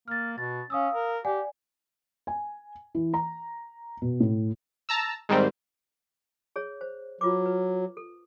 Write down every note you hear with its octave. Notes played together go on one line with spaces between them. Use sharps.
A#3 F6 A6
B2 A6
C#4 F5 D#6 E6
A#4
G4 D5 F#5 G#5
G#5
E3
A#5
B2
A2
A5 A#5 E6
G#2 D#3 G3 C4
G#4 C#5
C5
F#3 F4 B4 D6
B4
A4